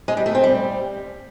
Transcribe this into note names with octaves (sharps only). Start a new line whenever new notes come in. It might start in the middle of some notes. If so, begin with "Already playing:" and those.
G#3
G3
A3
C4
G3